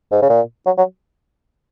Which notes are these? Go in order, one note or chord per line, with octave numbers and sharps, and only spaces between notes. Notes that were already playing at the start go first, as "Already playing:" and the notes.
G#2
C#3
A#2
F#3
F#3